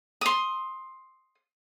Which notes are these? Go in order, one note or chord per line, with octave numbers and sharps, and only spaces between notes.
C6 D#6